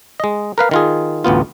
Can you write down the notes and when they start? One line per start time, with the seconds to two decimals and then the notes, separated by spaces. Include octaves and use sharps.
0.20 G#3 D#5
0.58 A#4 B4 F5
0.71 D#3 F4 G#4
1.24 A1 D2 B3 F4